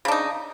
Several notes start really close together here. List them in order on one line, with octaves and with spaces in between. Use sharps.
C#3 D4 D#4